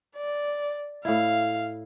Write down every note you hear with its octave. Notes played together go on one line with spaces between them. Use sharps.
D5
A2 E4 F5